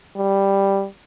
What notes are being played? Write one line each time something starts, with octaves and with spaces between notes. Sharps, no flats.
G3